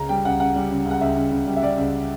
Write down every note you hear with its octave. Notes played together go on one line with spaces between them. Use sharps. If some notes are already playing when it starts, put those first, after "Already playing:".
Already playing: C#2 C#3 A#5
G3 G5
C#2 F#5
C#3 F#5
G3
C#3
C#2
F#5
C#2 E5
C#2
C#2
G3
E5
G3 D5
C#2